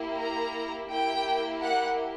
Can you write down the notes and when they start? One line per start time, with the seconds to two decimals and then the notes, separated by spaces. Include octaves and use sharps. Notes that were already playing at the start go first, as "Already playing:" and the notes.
Already playing: A#3 E4 G4
0.20 A#5
0.90 A#3 E4 G4 G5
1.62 F#5